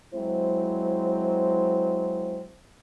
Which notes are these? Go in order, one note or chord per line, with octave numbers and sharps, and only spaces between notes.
F#3 G#3 C4 E4 C5